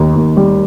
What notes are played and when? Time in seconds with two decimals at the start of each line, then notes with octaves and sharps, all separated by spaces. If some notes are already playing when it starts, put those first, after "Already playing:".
Already playing: D#2 D#3
0.15 D#2
0.37 G3